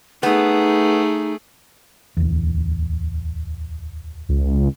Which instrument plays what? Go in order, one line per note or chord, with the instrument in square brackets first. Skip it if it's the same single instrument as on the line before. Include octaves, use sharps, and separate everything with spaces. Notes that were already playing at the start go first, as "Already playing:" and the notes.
[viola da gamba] A3 G#4 [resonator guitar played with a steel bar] B3 [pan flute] D#4
[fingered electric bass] D1 E2
[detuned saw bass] C#2